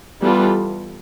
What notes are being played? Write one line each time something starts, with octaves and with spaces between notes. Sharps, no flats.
E3 G3 B3 F4 A4